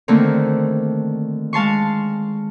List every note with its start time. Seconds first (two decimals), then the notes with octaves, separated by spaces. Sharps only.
0.08 D3 D#3 A3 A#3 C4
1.53 G#3 F5 A5 C6 C#6